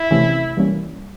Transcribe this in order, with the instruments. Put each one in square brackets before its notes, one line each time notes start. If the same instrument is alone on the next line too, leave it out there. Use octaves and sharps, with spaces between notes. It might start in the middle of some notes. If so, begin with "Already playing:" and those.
Already playing: [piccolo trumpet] E4
[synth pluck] C3 E3 A3 C#4
E3 G3 A#3 C#4